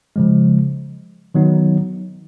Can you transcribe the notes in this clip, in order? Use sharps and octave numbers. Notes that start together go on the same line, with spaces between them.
C#3 F3 G#3
D#3 F#3 B3 D#4